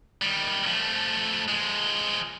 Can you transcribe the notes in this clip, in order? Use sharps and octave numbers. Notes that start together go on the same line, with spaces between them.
D#3 G3
F3 A3
F3 G#3